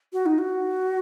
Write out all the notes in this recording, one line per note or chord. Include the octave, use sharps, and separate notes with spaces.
F#4
D#4
F#4